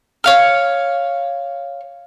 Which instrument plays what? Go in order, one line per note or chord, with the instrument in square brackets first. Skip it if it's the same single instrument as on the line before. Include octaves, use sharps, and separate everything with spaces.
[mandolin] C#5 F5 F6